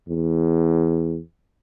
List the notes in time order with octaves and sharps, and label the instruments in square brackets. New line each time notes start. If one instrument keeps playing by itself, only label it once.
[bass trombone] E2